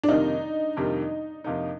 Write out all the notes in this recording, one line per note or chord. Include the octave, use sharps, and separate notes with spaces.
D4
F2 C3 D#3 G3 A#3 D#4
F2 C3 D#3 G3 A#3
F2 C3 F3 A#3 D#4